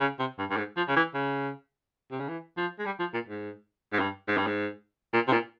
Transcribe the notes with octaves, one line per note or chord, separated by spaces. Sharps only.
C#3
C3
G2
G2
G#2
F3
C#3
E3
C#3
C3
C#3
E3
F3
G#3
G3
F3
A#2
G#2
G#2
G2
G#2
G2
G#2
A#2
C3
A#2